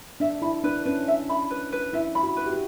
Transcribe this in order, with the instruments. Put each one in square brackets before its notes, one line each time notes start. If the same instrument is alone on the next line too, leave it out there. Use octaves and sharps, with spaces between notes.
[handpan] D4 [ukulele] E5
[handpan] E4 [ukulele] B5
[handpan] D4 [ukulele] B4
[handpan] C#4 [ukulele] B4
[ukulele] E5
B5
B4
B4
[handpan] E4 [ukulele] E5
[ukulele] B5
[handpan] F#4
[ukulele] B4
[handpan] G4
F#4